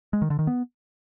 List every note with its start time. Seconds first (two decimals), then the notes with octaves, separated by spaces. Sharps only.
0.13 G#3
0.22 D#3
0.30 D3
0.39 D#3
0.47 B3